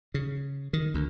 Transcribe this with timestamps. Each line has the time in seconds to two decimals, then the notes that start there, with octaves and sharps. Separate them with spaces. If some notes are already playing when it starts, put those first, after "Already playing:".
0.14 C#3
0.73 D#3
0.94 D2